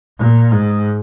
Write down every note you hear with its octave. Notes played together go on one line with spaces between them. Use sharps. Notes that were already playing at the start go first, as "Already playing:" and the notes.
A#2
G#2